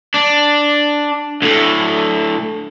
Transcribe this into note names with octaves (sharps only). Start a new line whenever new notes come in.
D4
D2 A2